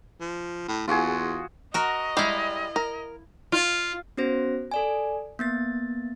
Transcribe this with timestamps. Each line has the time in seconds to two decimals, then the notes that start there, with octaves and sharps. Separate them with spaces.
0.20 F3
0.68 A2
0.88 E2 F4 F#4 G#4
1.74 F#4 A#4 D#5
2.17 G3 G#3 E4 F5
2.76 A#4
3.52 F4
4.17 B3 C#4 F#4 C5 A#6
4.71 A4 D5 G#5
5.39 A#3 B3 A6